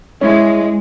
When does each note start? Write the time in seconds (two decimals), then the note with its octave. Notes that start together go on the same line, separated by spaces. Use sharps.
0.21 G#3 C#4 E4